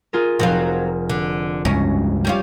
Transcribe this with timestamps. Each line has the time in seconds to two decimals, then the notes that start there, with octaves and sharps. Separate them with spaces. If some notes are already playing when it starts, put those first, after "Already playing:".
0.13 F4 G#4 A#4
0.39 F1 F#3 C4 F4
1.10 D3
1.65 C#2 G2 G#3 C#4 A#6
2.25 G3 C#4 F4